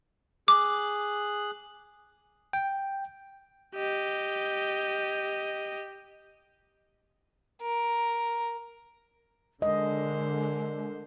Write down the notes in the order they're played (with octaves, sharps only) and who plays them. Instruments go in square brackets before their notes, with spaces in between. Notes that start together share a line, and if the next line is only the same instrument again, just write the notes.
[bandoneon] G#4 F#6 [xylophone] D6
[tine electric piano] G5
[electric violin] G4 D#5
[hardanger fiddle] A#4
[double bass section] D3 [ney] G#3 [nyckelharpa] A#4 C5 [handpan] D#5